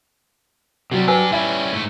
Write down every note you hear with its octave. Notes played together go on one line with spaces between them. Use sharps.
C3 F#3 G3
D4 G4 B4 G#5 E6
G3 C#4 E4
G#2 A3